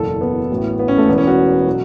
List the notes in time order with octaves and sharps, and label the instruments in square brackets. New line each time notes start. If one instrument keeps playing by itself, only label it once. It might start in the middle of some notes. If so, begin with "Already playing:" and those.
Already playing: [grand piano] F#1 E2 B2 F#3 A4
B3
A1 A2 F#3
B3
C#4
A3
E1 E2 E3 B3
C#4
F#4
B2 F#3